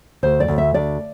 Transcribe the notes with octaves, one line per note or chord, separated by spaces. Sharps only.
D2 C5
D5
D2
E5
D2 D5